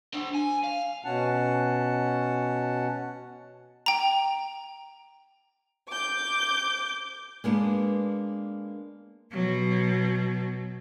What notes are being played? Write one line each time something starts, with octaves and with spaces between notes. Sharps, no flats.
D4 C5
G#5
F5
B2 C#4 F#5 A5
G5 A#5
D6 G6
G#3 A#3 B3 D4
B2 F#3